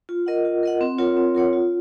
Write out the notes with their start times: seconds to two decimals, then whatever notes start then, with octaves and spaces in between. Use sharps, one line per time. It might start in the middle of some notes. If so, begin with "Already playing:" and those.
0.09 F4
0.26 A#4 D#5 F#5
0.45 F4
0.63 A#4 D#5 F#5
0.81 C4
0.98 F4 A#4 C#5 F#5
1.17 C4
1.35 F4 A#4 C#5 F#5
1.53 F4